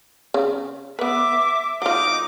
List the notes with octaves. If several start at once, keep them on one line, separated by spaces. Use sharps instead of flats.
C#3
B3 B4 E5 D6
F#3 D#4 F4 D6